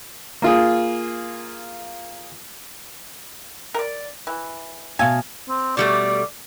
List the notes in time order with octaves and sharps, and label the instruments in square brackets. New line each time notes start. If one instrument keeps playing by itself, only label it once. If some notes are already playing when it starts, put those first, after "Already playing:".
[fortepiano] A#3 F4 G#4
[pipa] A#4 D5
E3
[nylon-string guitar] B2 F5 A5 [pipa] C#5 E5 G#5
[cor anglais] C4
[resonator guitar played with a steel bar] B2 G3 A3 [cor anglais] D5